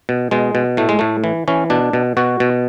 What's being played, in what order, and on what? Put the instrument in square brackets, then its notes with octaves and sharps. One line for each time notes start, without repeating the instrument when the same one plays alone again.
[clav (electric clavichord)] B2
B2 G#3
B2
A2 A3
G#3
A2 A3
E3
E3 C#4
B2 D4
B2
B2 F#4
B2